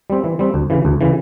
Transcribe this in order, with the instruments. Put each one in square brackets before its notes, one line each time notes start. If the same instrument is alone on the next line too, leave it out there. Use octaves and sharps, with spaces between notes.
[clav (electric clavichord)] G3 C4
E3
G3 C4
D2
C#3 E3
D2
C#3 E3